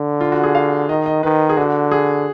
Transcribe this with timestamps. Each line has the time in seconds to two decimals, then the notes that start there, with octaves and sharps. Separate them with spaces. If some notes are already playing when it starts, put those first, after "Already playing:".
Already playing: D3
0.21 F4
0.32 F#4
0.43 G#4
0.55 F5
0.89 D#3 D#5
1.06 D#5
1.23 D#3 B4
1.49 G#4
1.57 D3 F#4
1.92 G#4